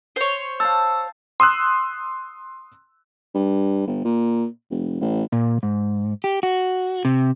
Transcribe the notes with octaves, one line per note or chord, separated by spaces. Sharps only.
C5 C#5
F5 G5 A5 E6
C6 D#6 E6 F#6
G2
G1
A#2
F1
A1
A#2
G#2
G4
F#4
C3